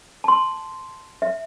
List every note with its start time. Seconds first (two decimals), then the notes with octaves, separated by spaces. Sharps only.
0.24 A5 C6
1.22 E5